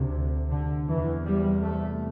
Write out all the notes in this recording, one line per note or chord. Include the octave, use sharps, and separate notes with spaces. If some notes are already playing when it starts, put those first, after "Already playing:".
Already playing: D2 C3
D3
E2 C3 E3
G3
A3